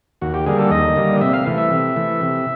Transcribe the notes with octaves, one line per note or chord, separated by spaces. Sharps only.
D#2 F#4
G4
D3 G3 A#3 G#4
A4
D#2 D#5
D3 G3 A#3
C3 E5
F5
E3 A3
E5
C3
E3 A3
C3